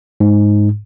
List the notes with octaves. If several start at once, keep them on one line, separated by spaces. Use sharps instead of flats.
G#2